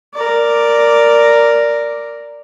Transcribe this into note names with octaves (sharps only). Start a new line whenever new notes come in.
A#4 D5